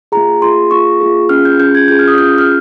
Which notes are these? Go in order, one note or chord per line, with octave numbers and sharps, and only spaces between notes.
A#3 F4 G#4 A#5
A#3 F4 G#4 C6
A#3 F4 G#4 C#6
A#3 F4 G#4
C#4 F4 G#4 F6
G6
C#4 F4 G#4 G6
G#6
C#4 F4 G#4 G6
F6
D#6
C#4 F4 G#4 G6
F6